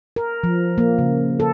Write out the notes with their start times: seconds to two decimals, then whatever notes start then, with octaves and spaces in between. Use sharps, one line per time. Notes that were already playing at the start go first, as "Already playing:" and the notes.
0.16 A#4
0.44 F3
0.78 A#3
0.99 C#3
1.40 A4